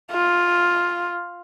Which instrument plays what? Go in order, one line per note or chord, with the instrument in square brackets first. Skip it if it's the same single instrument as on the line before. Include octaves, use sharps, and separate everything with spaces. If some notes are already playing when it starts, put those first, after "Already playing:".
[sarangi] F4